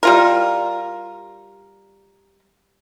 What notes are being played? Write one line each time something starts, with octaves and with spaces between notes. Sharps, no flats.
G3 F4 A#4